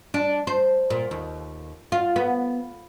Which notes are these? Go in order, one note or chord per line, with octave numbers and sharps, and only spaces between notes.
D4
C5
A#2
D#2
F4
B3